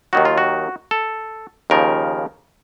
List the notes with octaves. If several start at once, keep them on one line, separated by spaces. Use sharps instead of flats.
D#2 D#3 F#3 F#4
F4
F#4
A4
D#2 C#3 F3 A#4